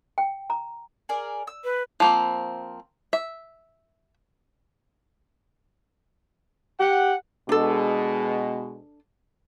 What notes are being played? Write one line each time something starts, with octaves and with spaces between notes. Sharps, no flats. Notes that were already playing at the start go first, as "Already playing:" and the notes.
G5
A#5
G#4 A#4 D5
E6
B4
F3 A#3 C4
E5
G4 F#5
B2 G#3 D4 A4